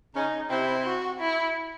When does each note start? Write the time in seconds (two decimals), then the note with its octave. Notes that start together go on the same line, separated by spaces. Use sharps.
0.15 C#3 C#4 D#4
0.50 C3 C4 E4
0.85 F#4
1.20 E4